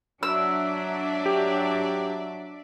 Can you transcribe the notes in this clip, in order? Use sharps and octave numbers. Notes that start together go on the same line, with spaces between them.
F#3 D4 D5 E5 E6
G4